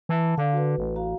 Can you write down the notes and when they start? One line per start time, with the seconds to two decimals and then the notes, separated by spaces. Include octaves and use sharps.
0.09 E3 A5
0.38 D3 F5
0.53 F#4 B4
0.78 A1
0.96 F#4 F5 A#5